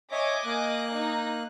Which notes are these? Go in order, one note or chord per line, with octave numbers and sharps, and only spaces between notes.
C#5 D#5 E5 G#5 D6
A#3 F#6
D#4